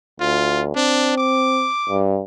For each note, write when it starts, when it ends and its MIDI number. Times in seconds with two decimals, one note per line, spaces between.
0.20 0.72 38
0.20 0.62 65
0.76 1.69 60
0.76 1.17 62
1.17 2.03 86
1.89 2.22 43